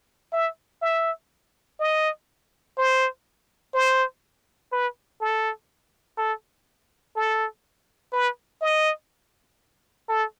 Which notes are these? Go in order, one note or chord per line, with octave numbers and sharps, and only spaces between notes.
E5
E5
D#5
C5
C5
B4
A4
A4
A4
B4
D#5
A4